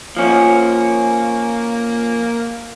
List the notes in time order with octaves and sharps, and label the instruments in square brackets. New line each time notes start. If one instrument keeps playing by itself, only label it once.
[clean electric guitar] F3 C#4 [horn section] A#3